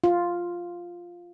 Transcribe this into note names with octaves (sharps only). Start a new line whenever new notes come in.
F4